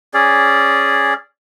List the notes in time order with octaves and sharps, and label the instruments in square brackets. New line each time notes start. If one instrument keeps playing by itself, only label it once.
[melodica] C#4 G#4 D5